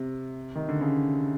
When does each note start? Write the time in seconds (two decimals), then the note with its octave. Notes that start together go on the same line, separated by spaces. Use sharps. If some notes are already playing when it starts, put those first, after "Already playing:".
Already playing: C3
0.55 D#3
0.69 D3
0.81 C#3